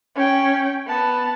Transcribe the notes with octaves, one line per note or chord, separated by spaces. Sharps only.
C#4 G5
B3 A5